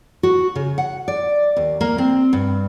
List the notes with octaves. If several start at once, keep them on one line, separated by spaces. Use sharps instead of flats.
F#4
C#3
F#5
D5
D#2
A#3
C4
G2